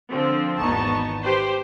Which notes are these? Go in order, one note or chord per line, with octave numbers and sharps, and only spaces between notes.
D3 F3 C4
G#1 E2 B3 D#4 A5 C#6
G4 B4 C5